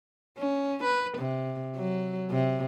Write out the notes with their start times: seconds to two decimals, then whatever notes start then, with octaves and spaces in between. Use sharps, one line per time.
0.38 C#4
0.84 B4
1.18 C3
1.76 F#3
2.31 C3